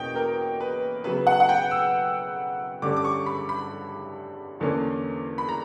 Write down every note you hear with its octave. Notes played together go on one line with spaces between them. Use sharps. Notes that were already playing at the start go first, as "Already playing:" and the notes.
Already playing: E2 B2 A#3 C#4 G5
A#4
B4
C#3 F#3 B3 B4
F#5
F#5
G5
E6
G2 D3 G3 C#4 D6
D6
C#6
B5
B5
E2 D3 A#3 C#4
B5
A#5